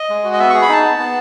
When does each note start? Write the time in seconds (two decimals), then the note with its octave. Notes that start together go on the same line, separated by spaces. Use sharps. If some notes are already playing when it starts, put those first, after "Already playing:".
Already playing: D#5
0.09 G#3
0.24 F#4
0.33 D#5
0.39 B3 E5
0.50 G#4 C#6
0.62 B5
0.69 D#4 A5
0.84 B3
0.99 B3